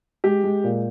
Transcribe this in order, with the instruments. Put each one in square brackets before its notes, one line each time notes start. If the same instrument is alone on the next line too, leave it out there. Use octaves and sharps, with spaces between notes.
[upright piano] G#3 G4
G#3
A#2